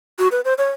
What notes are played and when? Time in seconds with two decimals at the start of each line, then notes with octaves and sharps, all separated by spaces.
0.19 F#4
0.32 B4
0.45 C5
0.58 C#5